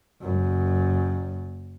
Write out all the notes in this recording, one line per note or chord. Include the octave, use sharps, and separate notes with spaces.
F#1 F#2